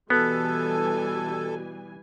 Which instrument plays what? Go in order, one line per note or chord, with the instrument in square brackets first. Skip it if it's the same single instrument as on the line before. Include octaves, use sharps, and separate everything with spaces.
[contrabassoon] B2 [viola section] E3 G3 G#5 [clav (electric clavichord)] B3 [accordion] A4